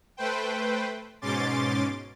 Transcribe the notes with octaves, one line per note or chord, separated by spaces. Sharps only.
A3 B4 C5 G5
G#2 B2 C#4 C6 D6 A6